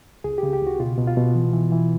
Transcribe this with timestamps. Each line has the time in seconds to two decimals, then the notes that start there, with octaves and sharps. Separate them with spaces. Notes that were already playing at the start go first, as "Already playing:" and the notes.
0.24 C#2 G#4
0.38 C#3 G4
0.53 G4
0.62 C#2 F#4
0.80 B2 F4
0.98 B2
1.07 F4
1.17 B2
1.35 E3
1.53 E3
1.72 E3